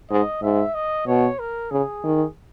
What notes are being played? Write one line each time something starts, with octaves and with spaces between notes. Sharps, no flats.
G#2 D#5
G#2 E5
D#5
B2 C#5
A#4
C#3 G#4
D#3